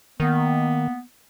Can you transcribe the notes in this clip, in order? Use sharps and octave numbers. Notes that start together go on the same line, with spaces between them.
D#3 A#3 B3